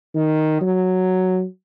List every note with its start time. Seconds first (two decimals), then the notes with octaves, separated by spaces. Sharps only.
0.15 D#3
0.61 F#3